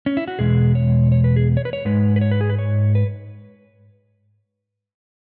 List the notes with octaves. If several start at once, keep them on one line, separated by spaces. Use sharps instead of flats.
C#4
E4
F#4
E2 B2 G#3 G#4
C#5
C#5
B4
G#4
C#5
B4
C#5
G#2 G#3 B4
B4
C#5
B4
G#4
B4
C#5
B4